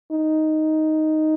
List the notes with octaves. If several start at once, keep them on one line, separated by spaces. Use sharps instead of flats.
D#4